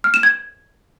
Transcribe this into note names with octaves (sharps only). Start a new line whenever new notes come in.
F6
E7
G#6